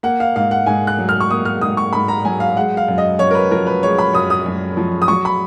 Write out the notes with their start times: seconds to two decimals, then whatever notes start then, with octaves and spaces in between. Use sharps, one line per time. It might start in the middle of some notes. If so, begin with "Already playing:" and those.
0.03 A#3 F#5
0.20 F5
0.36 G#2 F5
0.51 F#5
0.66 G#2 G#5
0.87 F#6
0.99 F#3
1.09 F6
1.20 C#6
1.31 A#3 D#6
1.45 F6
1.62 G#2 D#6
1.77 C#6
1.93 G#2 B5
2.08 A#5
2.25 F#3 G#5
2.40 F5
2.56 G#3 F#5
2.77 F5
2.88 F#2
2.98 D#5
3.19 F#2 C#5
3.31 A#4
3.35 B4
3.51 F3 A#4
3.67 B4
3.83 G#3 C#5
3.98 B5
4.13 F#2 D#6
4.30 D#6
4.46 F#2
4.77 F3
5.02 D#6
5.08 F#3 C#6
5.25 B5